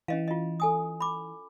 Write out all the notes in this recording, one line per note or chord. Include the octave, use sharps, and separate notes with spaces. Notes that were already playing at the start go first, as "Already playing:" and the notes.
E3 C#4 D#5 F5
F4 D#5
A4 G#5 D#6
B5 D6